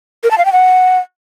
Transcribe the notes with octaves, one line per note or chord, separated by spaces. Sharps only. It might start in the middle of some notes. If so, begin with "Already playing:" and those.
A#4
A5
F5
G5
F#5